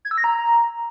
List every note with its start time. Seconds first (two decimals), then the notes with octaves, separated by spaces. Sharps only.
0.05 G#6
0.11 E6
0.18 A#6
0.24 A#5